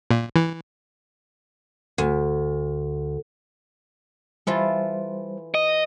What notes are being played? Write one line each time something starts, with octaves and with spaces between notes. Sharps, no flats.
A#2
E3
D2
E3 G3 F4 A4 C5
D#5